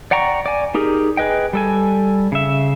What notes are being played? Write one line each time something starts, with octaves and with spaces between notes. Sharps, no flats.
D5 F#5 G5 A#5 C#6
D5 G#5
D#4 G4 G#4 A#4
G#4 B4 D#5 G5
G3 A4 G#5
C#3 E5